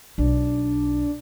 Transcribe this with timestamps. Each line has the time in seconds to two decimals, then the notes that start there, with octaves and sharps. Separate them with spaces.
0.18 B1 D4